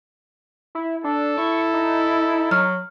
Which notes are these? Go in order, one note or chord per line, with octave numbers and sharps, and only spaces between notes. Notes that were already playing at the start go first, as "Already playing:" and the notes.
E4
D4 A4
E4 C#6
D#4
F#3 F6